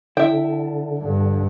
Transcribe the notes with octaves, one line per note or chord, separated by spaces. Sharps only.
D3 E4 E5 G5
G2